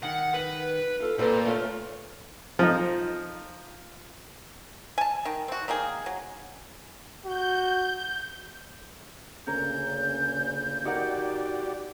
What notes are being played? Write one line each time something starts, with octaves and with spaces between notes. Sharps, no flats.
D#3 F#5
B4
F4 A4
A#2 C4 A4 B4
A3 C#4 F4
F3 D#4
G#5 A5
D#3
C4 F#4
D#3 A#3 D#4 G#4
F#3
F#4 G6
D2 A#2 C#3 C#4 A#4 G6
D#4 F#4 G4 A#4 D5 F#5